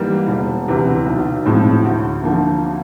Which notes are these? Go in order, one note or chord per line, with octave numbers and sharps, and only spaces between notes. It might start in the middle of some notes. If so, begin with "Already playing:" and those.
Already playing: G#2 E3 G3 A#3 D#4
E1
D2 C3 E3
B1
A2 F3 G#3 C4
D2
D3 F3 A#3